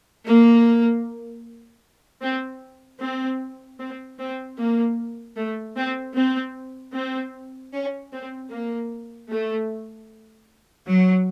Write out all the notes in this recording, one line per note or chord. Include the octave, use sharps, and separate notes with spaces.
A#3
C4
C4
C4
C4
A#3
A3
C4
C4
C4
C#4
C4
A#3
A3
F#3